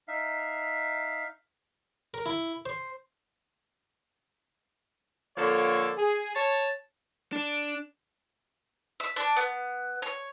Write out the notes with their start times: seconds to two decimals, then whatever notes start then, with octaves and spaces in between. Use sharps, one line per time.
0.08 D#4 E5 F5
2.14 A#4
2.26 E4
2.66 C5
5.36 D3 F3 A#3 A4 C#5
5.97 G#4
6.34 C#5 A5
7.32 D4
9.00 E5
9.16 D4
9.37 B3
10.02 C#5